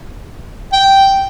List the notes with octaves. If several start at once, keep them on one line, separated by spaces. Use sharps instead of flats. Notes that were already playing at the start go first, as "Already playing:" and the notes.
G5